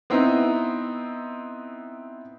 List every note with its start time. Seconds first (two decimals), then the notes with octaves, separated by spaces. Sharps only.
0.10 B3 C4 D#4 E4